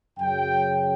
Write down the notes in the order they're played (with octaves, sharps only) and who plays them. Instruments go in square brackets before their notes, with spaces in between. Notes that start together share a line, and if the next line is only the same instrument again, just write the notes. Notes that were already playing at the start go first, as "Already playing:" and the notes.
[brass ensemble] F#2 C#3 F#3 G5